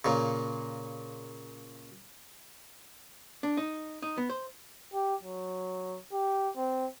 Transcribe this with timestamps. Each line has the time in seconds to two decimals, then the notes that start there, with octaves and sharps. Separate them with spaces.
0.05 A#2 C#3
3.43 D4
3.57 D#4
4.02 D#4
4.18 B3
4.30 C5
4.93 G4
5.23 F#3
6.13 G4
6.57 C4